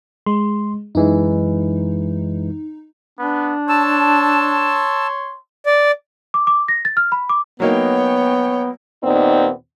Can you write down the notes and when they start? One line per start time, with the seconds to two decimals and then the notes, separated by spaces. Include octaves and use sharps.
0.26 G#3 C6
0.95 F#2 E3 G#3 D#4
3.19 B3 D4
3.69 C#5 A5 C6 E6
5.66 D5
6.34 D6
6.47 D6
6.68 A#6
6.85 A6
6.97 F6
7.12 B5
7.29 D6
7.60 F#3 A#3 B3 D#4 C#5 G5
9.03 D#2 A#2 B3 C4 D#4 D5